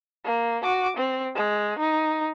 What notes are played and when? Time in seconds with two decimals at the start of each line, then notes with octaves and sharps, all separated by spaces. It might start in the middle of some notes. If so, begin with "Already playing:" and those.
0.24 A#3
0.63 F#4 D6
0.97 C4
1.35 G#3
1.78 D#4